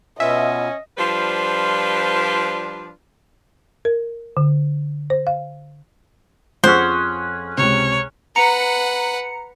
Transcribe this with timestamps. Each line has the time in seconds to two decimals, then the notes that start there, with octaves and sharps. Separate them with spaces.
0.20 B2 B3 C#4 F4 D#5 E5
0.98 F3 G3 D4 F4 B4 C5
3.85 A#4
4.37 D3
5.10 C5
5.27 F5
6.64 F2 F3 C#4 G#4 C5 F#5
7.58 C#2 C3 C#5
8.36 B4 F#5 A#5 C#7